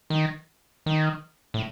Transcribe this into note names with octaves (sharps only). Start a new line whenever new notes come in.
D#3
D#3
A2